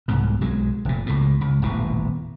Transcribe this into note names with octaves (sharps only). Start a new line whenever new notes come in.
C2 G#2 B2
B1 F#3 G#3
F1 A#2
C#2 A2
C#2
D#1 A1 B2